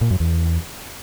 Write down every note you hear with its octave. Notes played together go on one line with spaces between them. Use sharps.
A#2
F#2
E2